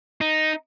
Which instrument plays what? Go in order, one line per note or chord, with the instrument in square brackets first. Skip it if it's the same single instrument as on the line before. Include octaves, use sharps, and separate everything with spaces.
[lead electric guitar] D#4